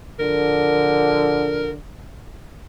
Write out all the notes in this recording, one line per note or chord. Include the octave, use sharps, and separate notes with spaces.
A#1 D3 A#4